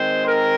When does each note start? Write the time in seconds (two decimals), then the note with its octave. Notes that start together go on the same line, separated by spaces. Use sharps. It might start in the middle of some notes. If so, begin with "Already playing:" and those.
Already playing: D#3 G#3 C4 C5
0.25 A#4